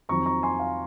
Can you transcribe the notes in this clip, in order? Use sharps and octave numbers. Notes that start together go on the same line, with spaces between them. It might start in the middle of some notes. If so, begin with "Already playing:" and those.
F2 D#3 F#3 A#5 C#6
A#5 C#6
G#5 C6
F5